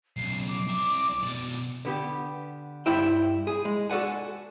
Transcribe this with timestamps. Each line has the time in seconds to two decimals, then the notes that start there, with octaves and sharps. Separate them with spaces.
0.17 B1 C#3 C7
0.48 D6
0.67 C2 E5
1.24 B2 D5
1.85 D3 B3 G4
2.86 G2 E4 C5 E5 G5
3.47 G#4
3.65 G#3
3.90 F#4 A4 D5 F#5 G#5